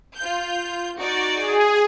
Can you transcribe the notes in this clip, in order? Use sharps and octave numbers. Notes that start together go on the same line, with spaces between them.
F4 G6
D#4 F#4 D5
G#4